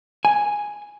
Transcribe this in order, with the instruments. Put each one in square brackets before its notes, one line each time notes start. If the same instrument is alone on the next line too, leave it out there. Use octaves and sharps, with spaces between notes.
[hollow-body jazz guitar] G#5